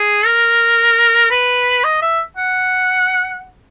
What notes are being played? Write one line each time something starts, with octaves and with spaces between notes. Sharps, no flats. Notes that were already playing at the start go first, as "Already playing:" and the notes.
Already playing: G#4
A#4
B4
D#5
E5
F#5